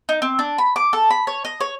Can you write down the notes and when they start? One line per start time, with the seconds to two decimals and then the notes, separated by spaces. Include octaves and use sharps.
0.09 D#4
0.22 C4
0.39 D4
0.58 B5
0.76 D6
0.93 A4
1.11 B5
1.27 C#5
1.45 D#5
1.61 C#5